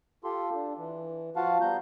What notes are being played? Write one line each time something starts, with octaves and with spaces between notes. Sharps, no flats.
F4 G4 A4 C6
D4
E3
F3 F4 F#4 F5 F#5 A5
G3 B3 A#5 G6